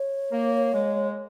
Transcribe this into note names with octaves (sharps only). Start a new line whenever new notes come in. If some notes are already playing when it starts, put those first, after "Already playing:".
Already playing: C#5
A#3
G#3